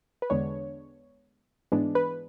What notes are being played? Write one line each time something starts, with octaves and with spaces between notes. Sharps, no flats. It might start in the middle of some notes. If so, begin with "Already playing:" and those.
B4
E2 D3 G#3 B3 D4 C#5
G#2 E3 G#3 B3 D4
B4